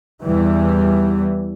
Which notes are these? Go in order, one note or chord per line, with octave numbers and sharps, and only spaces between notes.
E2 E3 G3